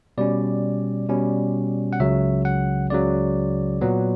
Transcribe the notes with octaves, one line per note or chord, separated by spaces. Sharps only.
B2 G3 C#4 D5
B2 G3 C#4
F#5
C#2 C#3 F#3 E5
F#5
C#2 C#3 F#3 D5
A#2 F#3 B3